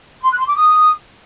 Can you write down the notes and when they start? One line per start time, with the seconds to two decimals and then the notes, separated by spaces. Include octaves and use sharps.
0.22 C6
0.30 F#6
0.38 C6
0.47 D6
0.55 D#6